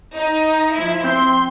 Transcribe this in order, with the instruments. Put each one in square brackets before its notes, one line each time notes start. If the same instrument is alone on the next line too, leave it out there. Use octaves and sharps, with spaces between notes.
[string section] D#4
F3 E4
[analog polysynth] C4 [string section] C6